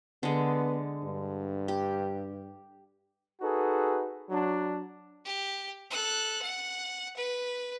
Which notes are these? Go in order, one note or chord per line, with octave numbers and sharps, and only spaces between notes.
D3 G#3 B3
G2
G4
D#4 F#4 G#4 A4 B4
F#3 D4
G4
A4 F#6
F#5
B4